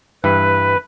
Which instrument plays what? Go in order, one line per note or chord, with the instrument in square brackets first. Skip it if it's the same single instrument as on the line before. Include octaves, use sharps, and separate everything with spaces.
[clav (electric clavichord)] G2 E3 [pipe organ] B4